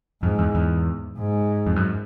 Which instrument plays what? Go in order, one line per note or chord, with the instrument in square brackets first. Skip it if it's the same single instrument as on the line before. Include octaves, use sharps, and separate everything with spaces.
[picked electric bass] F2 [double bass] G#2
[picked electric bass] E2
E2
[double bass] G#2
[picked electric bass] F2
F#2